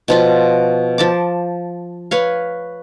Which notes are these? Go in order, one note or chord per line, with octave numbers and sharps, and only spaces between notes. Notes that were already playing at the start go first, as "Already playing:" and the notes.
B2 F3 F4
F3 A5 D6
B4 C#5 F5